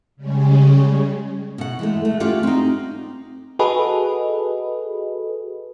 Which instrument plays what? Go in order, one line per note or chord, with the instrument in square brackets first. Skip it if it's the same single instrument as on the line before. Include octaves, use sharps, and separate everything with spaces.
[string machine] C#3 G3 G#3 C#4
[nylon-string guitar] B2 F#5
E3 G#3 A3
A3
A3 C#4 F4 G4 D5 F#5
C4 D#4
[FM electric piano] F#4 G#4 A4 B4 D#5